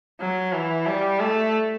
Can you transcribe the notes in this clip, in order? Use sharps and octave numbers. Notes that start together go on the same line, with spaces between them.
F#3
E3
G3
A3